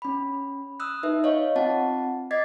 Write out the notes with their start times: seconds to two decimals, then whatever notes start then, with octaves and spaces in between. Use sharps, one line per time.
0.02 C#4 B5
0.80 D#6 E6 F#6
1.03 D#4 B4 E5
1.24 C#5 D#5 F5 C#6
1.56 C4 F4 F#5 A5
2.31 D#5 D6 G#6 A6 B6 C7